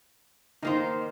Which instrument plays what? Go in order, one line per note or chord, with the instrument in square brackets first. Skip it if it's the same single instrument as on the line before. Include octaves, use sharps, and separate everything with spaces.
[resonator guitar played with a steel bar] D#3 A#3 C5 [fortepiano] D#4